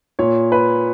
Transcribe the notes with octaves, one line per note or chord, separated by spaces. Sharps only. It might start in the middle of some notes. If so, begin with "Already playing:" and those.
A#2 C#5
B4